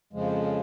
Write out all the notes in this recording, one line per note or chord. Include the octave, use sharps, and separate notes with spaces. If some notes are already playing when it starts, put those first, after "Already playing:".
F2 C#3 F3 G#3